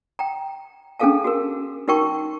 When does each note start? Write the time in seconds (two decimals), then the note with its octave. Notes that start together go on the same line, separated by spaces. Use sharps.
0.19 G5 A#5
1.00 C#4 D4 G#4 A4 F5 A5
1.24 F#4 G#4 A#4
1.88 D#4 F#4 A#4 G5 A5 C#6